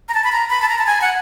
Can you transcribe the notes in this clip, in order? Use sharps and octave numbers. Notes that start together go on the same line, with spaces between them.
A#5
A5
B5
A#5
B5
A5
A#5
A5
G#5
F#5